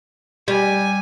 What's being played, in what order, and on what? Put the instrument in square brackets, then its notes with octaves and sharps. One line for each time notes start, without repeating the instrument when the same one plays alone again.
[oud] G3 [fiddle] G#5